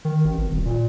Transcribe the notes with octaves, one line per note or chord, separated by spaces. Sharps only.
D#3
A1
G#1
D#1
A#2